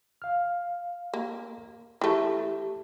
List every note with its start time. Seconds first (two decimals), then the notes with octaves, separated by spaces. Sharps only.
0.22 F5 F6
1.14 A#3
2.01 E3 A3 G4